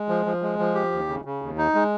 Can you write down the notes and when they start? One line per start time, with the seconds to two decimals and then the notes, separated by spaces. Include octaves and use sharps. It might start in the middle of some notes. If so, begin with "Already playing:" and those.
Already playing: G#3
0.09 F3
0.26 F3
0.42 G#3
0.59 F3
0.75 G4
0.91 D#2
1.09 C#3
1.25 C#3
1.42 D#2
1.58 D#4
1.75 G#3